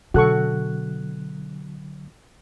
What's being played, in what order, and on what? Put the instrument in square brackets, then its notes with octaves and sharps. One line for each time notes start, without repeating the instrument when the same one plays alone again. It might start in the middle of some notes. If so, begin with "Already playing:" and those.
[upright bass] B2 [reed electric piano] D3 F#3 F#6 [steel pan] F#4 A4 C#6